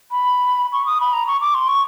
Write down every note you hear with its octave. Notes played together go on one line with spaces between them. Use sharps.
B5
C#6
D#6
B5
A#5
C#6
D6
C6
C#6